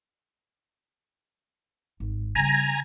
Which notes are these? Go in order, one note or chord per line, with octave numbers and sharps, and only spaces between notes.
G#1
C#3 G3 G#5 A#5